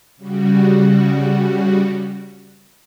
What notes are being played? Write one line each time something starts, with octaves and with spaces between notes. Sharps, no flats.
C#3 G3 F#4